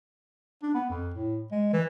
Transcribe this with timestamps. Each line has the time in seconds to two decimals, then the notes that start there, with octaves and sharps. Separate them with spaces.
0.63 D4
0.74 B3
0.90 F2
1.14 A2
1.52 G#3
1.73 E3